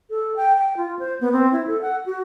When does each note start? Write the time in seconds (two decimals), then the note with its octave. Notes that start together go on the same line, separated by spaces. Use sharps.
0.10 A4
0.36 G5
0.57 G5
0.77 F4
0.99 C5
1.21 B3
1.32 C4
1.52 E4
1.67 A4
1.82 F#5
2.06 F#4